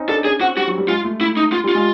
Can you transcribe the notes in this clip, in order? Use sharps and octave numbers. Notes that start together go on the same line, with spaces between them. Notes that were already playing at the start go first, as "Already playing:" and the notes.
Already playing: C4 C#4 D#4
D4 A4
C#4 G#4
C4 F#4
G3 F#4
F#3
G3
G#3 F4
A3
A3 E4
D#4
F4
G3 F4
G#3